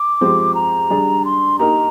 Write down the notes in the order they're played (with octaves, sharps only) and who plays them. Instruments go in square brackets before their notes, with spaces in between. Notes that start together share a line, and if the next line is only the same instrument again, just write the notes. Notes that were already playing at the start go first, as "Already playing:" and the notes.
Already playing: [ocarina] D6
[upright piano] F3 G#3 C4 G4 C5
[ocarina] A#5
[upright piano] G3 D4 G#4
[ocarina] C6
[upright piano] A#3 D#4 G4 A#4 [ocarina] A#5